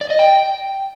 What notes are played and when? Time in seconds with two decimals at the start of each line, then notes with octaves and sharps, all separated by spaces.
0.01 D5
0.10 D#5
0.19 G5